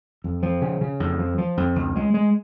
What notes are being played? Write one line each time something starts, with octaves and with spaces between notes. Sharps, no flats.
F2
F3
C#3
C#3
F2
F3
F3
F2
C#2
G#3
G#3